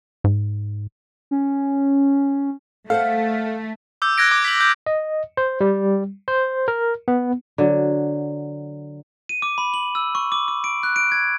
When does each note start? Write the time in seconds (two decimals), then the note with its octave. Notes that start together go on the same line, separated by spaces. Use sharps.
0.24 G#2
1.31 C#4
2.90 A3 A4 C5 F5 F#5
4.02 D6 E6 G6
4.18 F#6 G#6 A#6 D7
4.31 D6
4.45 B6 F#7
4.61 G6
4.87 D#5
5.37 C5
5.61 G3
6.28 C5
6.68 A#4
7.08 B3
7.58 D3 F#3
9.29 D#7
9.42 D6
9.58 B5
9.74 F#7
9.95 E6
10.15 C#6
10.32 D6
10.48 D6
10.64 D7
10.83 F#6
10.96 D7
11.12 G#6